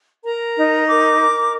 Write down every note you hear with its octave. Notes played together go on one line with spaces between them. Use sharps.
A#4 A#5
D#4
A#4 D6
A#4